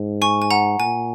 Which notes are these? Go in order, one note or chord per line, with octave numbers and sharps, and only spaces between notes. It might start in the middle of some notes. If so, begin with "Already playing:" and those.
Already playing: G#2
G#5 C#6
G#5
F#5 A#5
A#2 G#5